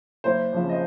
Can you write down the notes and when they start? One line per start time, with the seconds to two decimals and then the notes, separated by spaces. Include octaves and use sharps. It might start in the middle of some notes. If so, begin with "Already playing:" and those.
0.24 F#1 C5
0.53 F2 C#3 F3
0.69 D#5